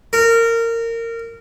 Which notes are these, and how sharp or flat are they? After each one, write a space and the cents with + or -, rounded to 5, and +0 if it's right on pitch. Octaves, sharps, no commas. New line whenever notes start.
A#4 -20